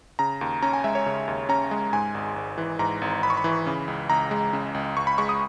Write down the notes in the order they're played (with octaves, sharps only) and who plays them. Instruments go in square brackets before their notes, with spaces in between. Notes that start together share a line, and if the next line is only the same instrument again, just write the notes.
[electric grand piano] C#3 A#5
D#2
C#4 A#5
G#5
G#3 E5
C#5
C#3
D#2
C#4 A#5
G#3
G#2 G#5
G#1
G#1
E3
G#2 A#5
G#1
G#1 B5
C#6
B5
E3
C#3
C#2
C#2 A#5
G#3
C#3
C#2
C#2 C#6
B5
G#3 C#6
D#6